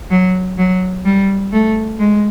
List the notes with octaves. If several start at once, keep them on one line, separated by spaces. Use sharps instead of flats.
F#3
F#3
G3
A3
G#3